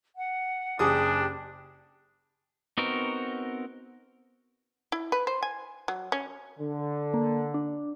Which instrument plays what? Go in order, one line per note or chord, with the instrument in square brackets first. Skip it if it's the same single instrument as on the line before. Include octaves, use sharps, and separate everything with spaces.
[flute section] F#5
[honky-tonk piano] F#1 G#4 D#6 [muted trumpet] D4 [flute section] G4
[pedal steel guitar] B3 C4 D#4 F#4 A#4
[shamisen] E4
B4
C5
G#5
F#3
C#4
[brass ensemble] D3
[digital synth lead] A#3
D4